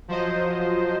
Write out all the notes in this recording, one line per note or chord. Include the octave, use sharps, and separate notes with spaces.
F3 F#3 C5 D#5